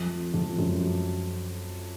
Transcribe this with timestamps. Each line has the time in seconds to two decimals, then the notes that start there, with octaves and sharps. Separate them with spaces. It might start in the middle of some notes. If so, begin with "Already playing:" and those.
Already playing: F2
0.34 F2
0.58 F#2